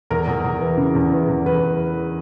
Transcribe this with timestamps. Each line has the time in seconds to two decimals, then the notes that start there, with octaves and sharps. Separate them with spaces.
0.10 E2 A#4
0.27 E2
0.44 E2
0.61 E3
0.77 C#3
0.95 E2
1.12 E3
1.29 E2
1.45 E2 B4